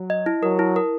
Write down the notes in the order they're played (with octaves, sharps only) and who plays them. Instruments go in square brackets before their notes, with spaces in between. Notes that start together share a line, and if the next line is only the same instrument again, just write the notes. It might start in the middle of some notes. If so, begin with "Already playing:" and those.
Already playing: [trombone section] F#3
[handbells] D#5
E4
[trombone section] F#3 [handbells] A#4
[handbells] E4
A#4